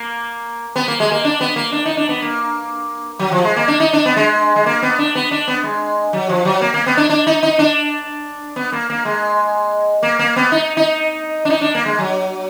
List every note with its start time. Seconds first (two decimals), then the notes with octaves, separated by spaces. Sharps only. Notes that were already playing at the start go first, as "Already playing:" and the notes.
Already playing: A#3
0.76 B3
0.88 A#3
1.00 G#3
1.12 A#3
1.25 D4
1.41 B3
1.56 A#3
1.72 D4
1.86 D#4
1.97 D4
2.09 B3
2.22 A#3
3.19 F#3
3.32 F3
3.44 G#3
3.56 A#3
3.68 D4
3.80 D#4
3.93 D4
4.05 B3
4.16 G#3
4.56 G#3
4.66 A#3
4.82 B3
4.99 D4
5.15 B3
5.31 D4
5.48 B3
5.64 G#3
6.13 F#3
6.29 F3
6.45 F#3
6.61 A#3
6.74 A#3
6.86 B3
6.97 D4
7.10 D4
7.27 D#4
7.43 D#4
7.59 D4
8.56 B3
8.72 A#3
8.90 A#3
9.05 G#3
10.03 A#3
10.19 A#3
10.36 B3
10.52 D#4
10.77 D#4
11.45 D4
11.50 D#4
11.61 D4
11.75 A#3
11.86 G#3
11.98 F#3